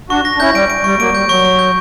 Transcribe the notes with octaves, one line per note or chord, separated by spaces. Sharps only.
D4 F#4 C#6
A#6
D4
C#4 E4 G6
G3 D7
D7
G3 C#6
F#3 A#3 D7
G3 G6
F#3 C#6
C#6
G6